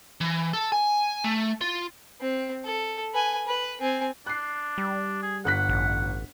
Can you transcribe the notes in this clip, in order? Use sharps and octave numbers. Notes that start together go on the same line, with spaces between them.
E3
A4
G#5
A3
F4
C4
A4
B4 G#5
B4
C4 G#5
D4 F#6 C7
G3
G#4
G1 F#5 F#6 B6
A1